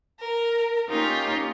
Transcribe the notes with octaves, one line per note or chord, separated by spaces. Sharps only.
A#4
A#3 C#4 D#4 F4 G4